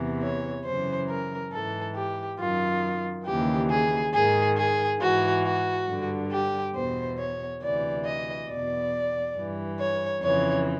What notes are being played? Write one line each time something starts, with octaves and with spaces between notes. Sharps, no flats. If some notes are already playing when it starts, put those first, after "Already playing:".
Already playing: E2 C3 E3
C#5
F#2 C#3 E3 C5
A#4
G#2 E3 A4
G4
F#2 D#3 F4
D#2 C#3 E3 G4
G#4
G#2 D#3 G#4
G#4
G#2 E3 F#4
F#4
G2 D3
G4
E2 B2 C5
C#5
D2 C3 E3 D5
D#5
E2 B2 D5
G2 E3
C#5
F2 C#3 E3 C#5